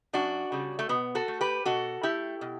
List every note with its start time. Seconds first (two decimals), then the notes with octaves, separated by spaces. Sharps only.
0.13 F#2 D4 F#4
0.52 C#3 G3
0.79 A3
0.89 B2 B3
1.15 F#4 A4
1.28 A3
1.41 G4 B4
1.65 B2 F#4 A4
2.03 A3 E4 G4
2.41 B2